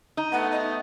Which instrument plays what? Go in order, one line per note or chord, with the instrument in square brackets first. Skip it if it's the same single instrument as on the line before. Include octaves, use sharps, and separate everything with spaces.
[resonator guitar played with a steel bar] D#4
[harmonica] A3 B3 [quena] F#5
[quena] D#5